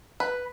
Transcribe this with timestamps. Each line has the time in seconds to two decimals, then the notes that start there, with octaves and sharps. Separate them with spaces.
0.20 B4